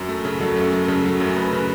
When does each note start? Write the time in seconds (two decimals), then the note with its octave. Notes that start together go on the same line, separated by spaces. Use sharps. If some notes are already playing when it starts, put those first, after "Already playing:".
Already playing: F#2 F#4
0.09 A3
0.25 C#3
0.40 F#3 A4
0.56 F#2
0.73 A3
0.88 C#3 A4
1.04 F#3
1.20 F#2
1.36 A3 B4
1.52 C#3